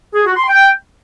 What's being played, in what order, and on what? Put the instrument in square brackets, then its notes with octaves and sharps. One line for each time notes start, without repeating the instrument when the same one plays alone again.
[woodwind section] G#4
F#4
C6
G5